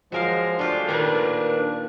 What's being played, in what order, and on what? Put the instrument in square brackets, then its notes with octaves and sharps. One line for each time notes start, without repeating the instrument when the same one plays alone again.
[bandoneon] F3 G#3 [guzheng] F#3 A#4 F5
[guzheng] A3 F4 G4 [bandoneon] D4
[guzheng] A#2 D#3 [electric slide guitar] A#4 B4